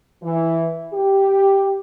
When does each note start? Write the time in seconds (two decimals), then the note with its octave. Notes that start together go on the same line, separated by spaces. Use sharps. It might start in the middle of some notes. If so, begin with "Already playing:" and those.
0.23 E3
0.94 G4